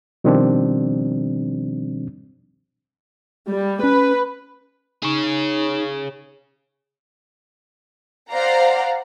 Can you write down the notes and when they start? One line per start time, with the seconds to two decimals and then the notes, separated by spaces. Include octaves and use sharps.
0.24 B2 D#3 F3 G3 C4 D4
3.50 G3
3.84 C#4 B4
5.03 D#4 G#4 C#5
8.31 C5 D5 F5 F#5 A#5